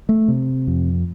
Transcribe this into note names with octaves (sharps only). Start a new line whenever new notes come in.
A3
C3
F2